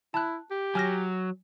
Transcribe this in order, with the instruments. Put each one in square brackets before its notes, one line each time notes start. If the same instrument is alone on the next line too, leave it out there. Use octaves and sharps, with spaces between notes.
[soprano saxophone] E4 [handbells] A5 F#6
[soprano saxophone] G4
[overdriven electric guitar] F#3 [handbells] G#5 F6 A#6